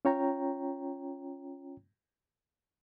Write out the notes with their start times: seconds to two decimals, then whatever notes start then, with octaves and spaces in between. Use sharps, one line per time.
0.05 C#4 F4 C#5 G5 A#5